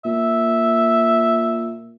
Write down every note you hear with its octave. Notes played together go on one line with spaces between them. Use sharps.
A#2 E5